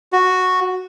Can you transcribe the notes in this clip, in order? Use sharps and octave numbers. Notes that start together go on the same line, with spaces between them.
F#4